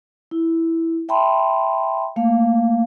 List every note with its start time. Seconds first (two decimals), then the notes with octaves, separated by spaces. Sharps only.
0.31 E4
1.09 E5 G5 A5 B5 C6
2.16 A3 A#3 F5